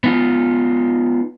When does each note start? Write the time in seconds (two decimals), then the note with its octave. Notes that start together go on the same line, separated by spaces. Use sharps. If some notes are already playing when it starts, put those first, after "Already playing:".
0.04 B3 D#4 F4